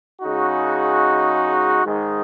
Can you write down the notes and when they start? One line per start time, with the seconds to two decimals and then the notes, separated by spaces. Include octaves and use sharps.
0.22 C#3 G#3 D#4 F#4
1.84 G#2 D#3 G#3 D#4